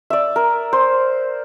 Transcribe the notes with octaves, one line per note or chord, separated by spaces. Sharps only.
D5 E5
A#4
C5